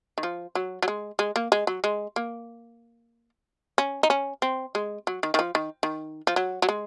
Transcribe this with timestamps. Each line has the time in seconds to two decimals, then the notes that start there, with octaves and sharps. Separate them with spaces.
0.18 D#3
0.23 F3
0.55 F#3
0.82 F#3
0.88 G#3
1.19 G#3
1.36 A#3
1.52 G#3
1.67 F#3
1.84 G#3
2.16 A#3
3.78 C#4
4.03 D#4
4.10 C#4
4.42 C4
4.75 G#3
5.07 F#3
5.23 D#3
5.34 D#3
5.39 F3
5.55 D#3
5.83 D#3
6.27 F3
6.36 F#3
6.62 F#3
6.69 G#3